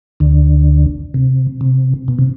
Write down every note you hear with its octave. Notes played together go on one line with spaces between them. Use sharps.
D2 D3
C3
C3
B2
C3